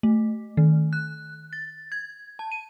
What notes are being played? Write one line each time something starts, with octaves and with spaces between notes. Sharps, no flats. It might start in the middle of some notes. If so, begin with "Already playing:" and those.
A3
D#3
F#6
A6
G#6
A5
D#7